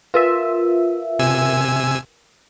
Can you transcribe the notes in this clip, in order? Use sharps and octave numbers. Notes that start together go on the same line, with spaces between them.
F4 A#4 B4 E5
C3 G#5 E6